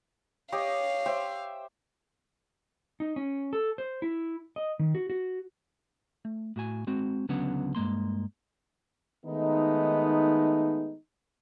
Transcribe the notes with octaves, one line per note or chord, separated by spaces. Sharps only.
G4 C#5 D#5 F5
C5 E5 G5
D#4
C#4
A4
C5
E4
D#5
D#3
F#4
F#4
A3
A2 F#4 G#5
G#3 C4 F#4
C#2 D3 F#3 B3 C#4 F#5
G2 G#3 A#3 C6
D#3 G#3 A3 B3 D#4